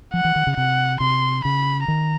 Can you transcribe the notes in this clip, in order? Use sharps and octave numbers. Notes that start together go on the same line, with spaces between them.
F3 F#5
E3
D#3
C#3
C3 F#5
C3 C6
C#3 B5
D#3 A#5